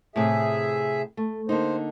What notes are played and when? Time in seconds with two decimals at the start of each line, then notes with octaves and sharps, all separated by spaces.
0.16 A2 C3 G#4 E5
1.17 A3
1.49 D3 A#3 D#4 C5